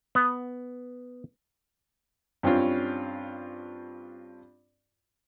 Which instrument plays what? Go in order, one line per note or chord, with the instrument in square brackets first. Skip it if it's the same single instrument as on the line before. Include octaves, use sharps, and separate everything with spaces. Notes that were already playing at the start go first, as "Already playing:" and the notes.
[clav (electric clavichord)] B3
[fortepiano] G2 C4 C#4 F4